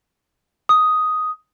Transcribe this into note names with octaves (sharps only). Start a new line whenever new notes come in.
D#6